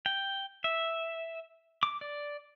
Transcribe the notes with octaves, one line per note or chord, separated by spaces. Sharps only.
G5
E5
D6
D5